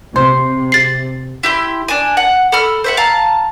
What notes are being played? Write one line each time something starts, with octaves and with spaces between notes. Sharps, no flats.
C3 C5
A6 C7
E4 G4 C6
D4 G#5
F#5
A4 B5 E6 F6
C5 E5 F#5
F5 A5 A#5